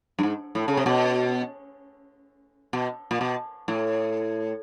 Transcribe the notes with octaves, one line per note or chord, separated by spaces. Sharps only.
G2
G#2
A2
C#3
C3
B2
B2
A#2
B2
A2